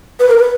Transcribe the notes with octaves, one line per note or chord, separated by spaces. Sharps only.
B4
A#4
B4